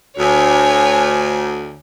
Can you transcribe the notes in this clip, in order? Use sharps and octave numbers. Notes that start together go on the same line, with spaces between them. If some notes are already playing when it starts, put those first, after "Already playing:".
D2 C#5 G#5